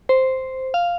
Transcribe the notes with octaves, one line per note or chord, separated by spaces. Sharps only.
C5
F5